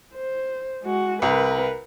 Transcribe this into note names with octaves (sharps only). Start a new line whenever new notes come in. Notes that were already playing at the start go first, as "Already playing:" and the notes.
C5
G#3 F#4
C2 A#4 B4